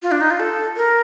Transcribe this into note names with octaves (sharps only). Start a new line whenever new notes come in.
F4
D4
D#4
F4
A4
A#4